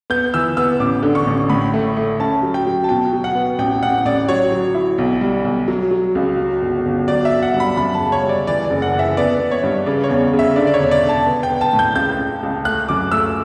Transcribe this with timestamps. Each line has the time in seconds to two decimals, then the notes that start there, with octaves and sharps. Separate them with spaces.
0.10 B3 G6
0.34 E3 E6
0.57 B3 E6
0.80 A1 D6
1.03 D3
1.15 C#6
1.27 A1
1.49 A2 B5
1.74 A3
1.97 A3
2.20 C#4 A5
2.43 F#3
2.54 G5
2.66 F#3
2.84 A5
2.89 B2 G5
3.13 F#3
3.24 F#5
3.35 B3
3.59 A1 G5
3.83 A1 F#5
4.05 A1 D5
4.29 F#3 C#5
4.52 F#3
4.75 E4
4.98 B1
5.21 G3
5.45 B1
5.68 F#3
5.91 F#3
6.15 C#2
6.37 F#3
6.62 G1
6.85 G1
7.08 F#3 D5
7.25 E5
7.30 G1
7.43 F#5
7.54 G2
7.60 B5
7.77 F#2 B5
7.94 A5
8.00 C#3
8.12 C#5
8.23 G3
8.29 D5
8.47 E3 D5
8.65 D5
8.70 F#1
8.82 F#5
8.94 E3
8.99 E5
9.17 B3 D5
9.40 B3
9.51 C#5
9.63 G2
9.86 C#3 D5
10.04 C#5
10.09 E2
10.33 C#3
10.39 E5
10.56 D3 D5
10.67 D5
10.74 C#5
10.79 E1
10.91 D5
11.03 D3
11.09 A5
11.27 B3
11.43 G5
11.50 B3
11.61 A5
11.73 A2
11.79 G6
11.95 C#2 G6
12.19 C#2
12.43 C#2
12.65 A3 F#6
12.89 F#2 D6
13.12 A3 E6